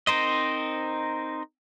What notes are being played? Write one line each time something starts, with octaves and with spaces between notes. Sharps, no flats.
C4 D#4 A#4 C5 D#5